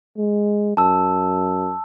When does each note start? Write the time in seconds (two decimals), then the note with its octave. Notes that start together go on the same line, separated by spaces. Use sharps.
0.17 G#3
0.77 F#2 A5 E6